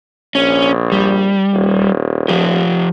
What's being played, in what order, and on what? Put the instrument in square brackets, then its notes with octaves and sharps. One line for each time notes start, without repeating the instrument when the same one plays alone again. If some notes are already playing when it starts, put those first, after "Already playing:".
[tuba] A#1 [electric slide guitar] C#4
[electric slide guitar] G3
[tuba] D#1
[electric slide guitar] F3 G4